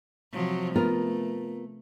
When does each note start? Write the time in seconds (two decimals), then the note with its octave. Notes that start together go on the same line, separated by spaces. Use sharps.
0.33 C3 F3 F#3
0.76 A3 B3 F4 A#4